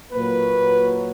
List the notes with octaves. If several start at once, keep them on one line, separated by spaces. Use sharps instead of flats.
A#2 F#3 A#3 B4